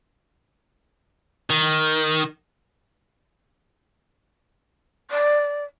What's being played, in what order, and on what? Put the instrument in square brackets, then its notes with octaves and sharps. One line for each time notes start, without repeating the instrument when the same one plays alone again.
[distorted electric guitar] D#3
[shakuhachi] D5